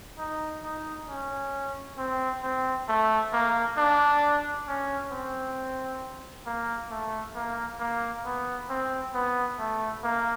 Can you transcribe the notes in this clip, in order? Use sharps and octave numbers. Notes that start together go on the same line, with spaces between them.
D#4
D#4
C#4
C4
C4
A3
A#3
D4
C#4
C4
A#3
A3
A#3
A#3
B3
C4
B3
A3
A#3